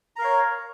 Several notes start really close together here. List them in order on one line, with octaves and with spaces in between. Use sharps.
A#5 A#4 F5 C#5